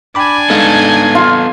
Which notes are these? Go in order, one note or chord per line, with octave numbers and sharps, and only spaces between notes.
D4 G5 G#5 B5 D6
G#3 B3 D#4 A4 F5
F4